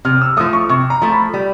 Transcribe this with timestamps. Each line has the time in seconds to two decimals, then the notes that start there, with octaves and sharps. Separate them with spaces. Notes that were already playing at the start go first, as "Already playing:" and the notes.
0.05 C3 F6
0.21 E6
0.37 F3 A3 D#6
0.53 C#6
0.69 C3 C#6
0.90 A#5
1.02 F3 A3
1.12 B5
1.34 G3